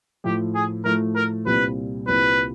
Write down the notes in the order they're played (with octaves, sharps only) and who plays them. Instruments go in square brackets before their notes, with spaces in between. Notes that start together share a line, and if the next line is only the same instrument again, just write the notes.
[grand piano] A2 F3 A3 [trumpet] G4
[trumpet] G#4
[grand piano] A2 F3 A3 [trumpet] A#4
[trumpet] A#4
[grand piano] C2 A#2 G3 C4 F4 [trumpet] B4
[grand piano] C2 A#2 G3 C4 F4 [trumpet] B4